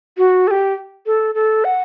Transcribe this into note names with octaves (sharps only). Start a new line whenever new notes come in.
F#4
A4
G4
A4
A4
F#5